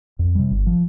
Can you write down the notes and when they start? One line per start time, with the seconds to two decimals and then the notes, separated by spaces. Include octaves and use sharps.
0.19 F2
0.35 C3 G3
0.51 G1
0.67 F3